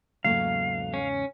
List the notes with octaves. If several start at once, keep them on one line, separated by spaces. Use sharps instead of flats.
E2 G#2 C#3 F#3 A3 A#3 F5
C#4